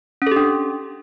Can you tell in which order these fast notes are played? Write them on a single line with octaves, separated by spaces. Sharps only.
C#4 A4 G4 D4